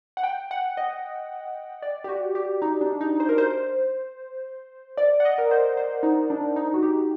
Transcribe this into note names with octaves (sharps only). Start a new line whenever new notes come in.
F#5
G5
F#5
D#5
D5
G4
F#4
G4
D#4
D4
D#4
C5
A#4
C5
D5
F#5
D#5
A#4
C5
C5
D#4
D4
D#4
F#4
G4